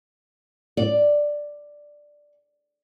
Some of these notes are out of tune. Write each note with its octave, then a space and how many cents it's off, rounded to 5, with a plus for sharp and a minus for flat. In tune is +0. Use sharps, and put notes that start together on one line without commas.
D5 +5